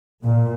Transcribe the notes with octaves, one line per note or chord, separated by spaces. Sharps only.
A#2